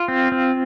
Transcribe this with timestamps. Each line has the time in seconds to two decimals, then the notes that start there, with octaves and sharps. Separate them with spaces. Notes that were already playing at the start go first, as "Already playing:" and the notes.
Already playing: F4
0.08 C4
0.32 C4